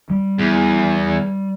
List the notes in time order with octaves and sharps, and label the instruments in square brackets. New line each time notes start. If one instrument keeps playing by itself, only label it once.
[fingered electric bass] G3
[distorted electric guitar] E2